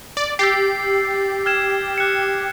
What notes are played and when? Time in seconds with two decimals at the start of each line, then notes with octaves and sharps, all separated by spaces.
0.17 D5
0.39 G4 E6 A6 C7
1.46 F6 G#6 E7
1.98 F#6 C#7